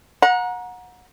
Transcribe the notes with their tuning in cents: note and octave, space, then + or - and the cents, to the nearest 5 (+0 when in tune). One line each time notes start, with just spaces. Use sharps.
F#5 -25 A#5 +20